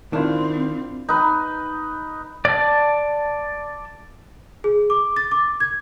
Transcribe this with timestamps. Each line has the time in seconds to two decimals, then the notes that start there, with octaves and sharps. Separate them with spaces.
0.13 D#3 C4 D4 E4 F4
1.09 D#4 B4
2.45 D5 A5
4.64 G#4
4.90 D6
5.16 A6
5.32 D6
5.60 G#6